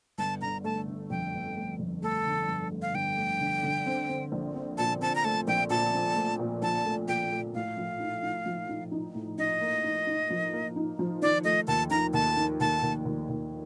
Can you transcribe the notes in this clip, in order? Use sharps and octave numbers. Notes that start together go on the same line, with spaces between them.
G1 A5
D3 A#5
A3 A5
D3
F2 G5
G1
A3
F2
A3 A4
D3
G1
A3
F5
G1 G5
A3
D3
D3
C4
C4
A#1
C4
A#2 A5
C4 A5
A#5
A3 A5
A#1 G5
A#2 A5
C4
A3
A#2
A#1 A5
A3
A#2 G5
A3
A2 F5
F3
D#4
D#4
F3
D#4
D#4
A2
D#4 D#5
A#3
D#4
D#4
F3
A#3
D#4
F3
D#3 D5
A3 D#5
D#2 A5
D#3 A#5
D#2 A5
D#3
D#2 A5
D#2
D#2
D#2